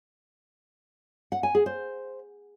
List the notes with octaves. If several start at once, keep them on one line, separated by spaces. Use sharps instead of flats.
F#5
G#5
G#4
C5